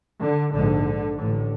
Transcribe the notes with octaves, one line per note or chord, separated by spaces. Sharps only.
D3
A#1 G#2 D3
A1 A2 D3